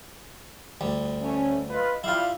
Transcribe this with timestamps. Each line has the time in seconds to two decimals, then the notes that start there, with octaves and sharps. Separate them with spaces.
0.81 D2 G3
1.22 A3 C#4
1.70 F4 B4 D#5
2.04 G3 E4 F4 F5